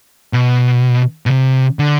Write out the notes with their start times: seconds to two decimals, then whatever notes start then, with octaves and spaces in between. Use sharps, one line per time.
0.33 B2
1.26 B2
1.30 C3
1.79 D3